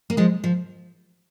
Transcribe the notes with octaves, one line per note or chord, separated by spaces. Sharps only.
A#3
F3 G#3
F3